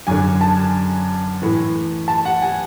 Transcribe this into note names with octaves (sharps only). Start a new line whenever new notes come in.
F#2 D3 G#5
A5
A2 E3
A5
F#5
G#5